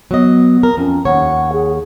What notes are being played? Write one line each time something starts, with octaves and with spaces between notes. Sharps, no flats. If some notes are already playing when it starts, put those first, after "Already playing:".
F#3 B3 D#5
A#4
F2 C#4
D#2 C#5 F#5
G#4